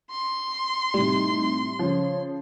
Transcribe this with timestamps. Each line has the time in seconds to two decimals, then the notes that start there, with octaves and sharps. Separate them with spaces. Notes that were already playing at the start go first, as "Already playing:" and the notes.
0.11 C6
0.94 A2 C3 G3 D#4
1.79 C#3 F3 C#5